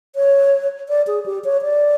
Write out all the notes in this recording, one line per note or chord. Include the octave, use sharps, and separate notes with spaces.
C#5
D5
G#4
G4
C#5
D5